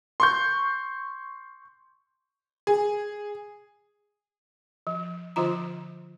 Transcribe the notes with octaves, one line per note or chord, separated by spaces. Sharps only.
C6 C#6 G6
G#4
F3
D3 F3 F4 A#5